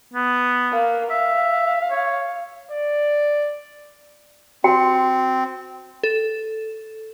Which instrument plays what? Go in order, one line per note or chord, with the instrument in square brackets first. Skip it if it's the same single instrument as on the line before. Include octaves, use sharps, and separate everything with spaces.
[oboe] B3
[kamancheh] A#3
[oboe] E5 [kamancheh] F5
[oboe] C#5
[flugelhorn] D5
[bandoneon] C4 [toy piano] F#4 G5
[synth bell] A4